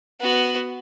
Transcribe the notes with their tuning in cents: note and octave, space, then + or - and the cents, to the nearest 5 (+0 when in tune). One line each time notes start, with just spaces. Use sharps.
B3 +5 F#4 +0